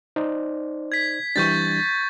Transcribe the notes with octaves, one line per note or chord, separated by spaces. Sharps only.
D#4 C5 D5
G#6 B6
E3 G3 D4 C#6 G6 A6